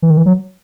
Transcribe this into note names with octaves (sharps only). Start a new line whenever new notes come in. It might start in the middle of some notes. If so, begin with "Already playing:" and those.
E3
D#3
E3
F#3